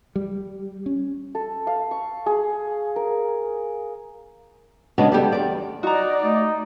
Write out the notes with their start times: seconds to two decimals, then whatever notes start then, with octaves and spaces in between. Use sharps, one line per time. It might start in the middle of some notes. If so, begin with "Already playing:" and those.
0.16 G3
0.86 C#4
1.35 A4
1.67 F5
1.91 C#6
2.26 G#4
2.96 A#4
4.98 C#3 G#3 B3 D4 F#4
5.12 G3 B3 G4 A4
5.32 E2 D5
5.83 D#4 F#4 D5 A#5
6.23 A3 D#4